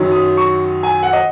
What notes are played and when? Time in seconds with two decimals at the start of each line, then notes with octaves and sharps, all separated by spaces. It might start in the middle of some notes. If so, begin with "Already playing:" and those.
Already playing: F#2 D#3 F#3
0.12 D#6
0.37 C#6
0.83 G#5
1.03 F#5
1.13 D#5